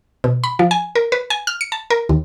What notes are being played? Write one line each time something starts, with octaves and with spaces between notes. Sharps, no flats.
B2
B5
F3
G#5
A#4
B4
G#5
F6
C#7
A5
A#4
D#2